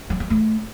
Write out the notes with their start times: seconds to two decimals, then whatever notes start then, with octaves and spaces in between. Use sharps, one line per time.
0.10 F#3
0.20 F#3
0.30 A3